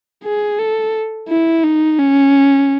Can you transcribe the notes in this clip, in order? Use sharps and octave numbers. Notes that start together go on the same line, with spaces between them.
G#4
A4
E4
D#4
C#4